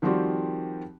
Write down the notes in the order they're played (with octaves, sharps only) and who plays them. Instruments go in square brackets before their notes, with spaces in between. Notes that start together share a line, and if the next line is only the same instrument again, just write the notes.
[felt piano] D#3 F3 G3 C4 F#4 G4